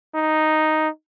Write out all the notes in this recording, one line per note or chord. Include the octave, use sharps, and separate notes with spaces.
D#4